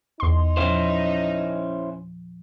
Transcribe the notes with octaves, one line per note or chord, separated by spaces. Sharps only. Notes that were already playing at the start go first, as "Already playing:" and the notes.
E2 D#4 C6
A#2 F3 C#4 E4 C5